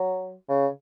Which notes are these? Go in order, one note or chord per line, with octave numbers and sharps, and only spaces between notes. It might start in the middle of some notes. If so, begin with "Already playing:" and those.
Already playing: F#3
C#3